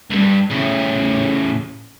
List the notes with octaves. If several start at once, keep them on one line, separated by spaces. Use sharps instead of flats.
C#2 G2
A2 C#3